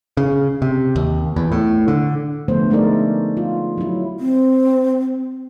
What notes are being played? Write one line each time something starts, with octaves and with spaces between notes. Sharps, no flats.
C#3
C3
D#2
E2
A2
D3
D3 F3 A3 B3 C5
G#3 A3 D#4 A#4 D5
F4
F#3 E4
C4